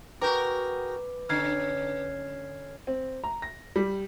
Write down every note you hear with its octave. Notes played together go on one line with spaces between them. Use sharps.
F#4 G#4 A#4 B4 G5 A#5 D6 G6
D3 C#4 F6 G#6 C7
C4
A#5
A#6
G3